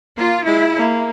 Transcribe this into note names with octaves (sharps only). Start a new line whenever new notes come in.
A#3 F4
G#3 E4
A#3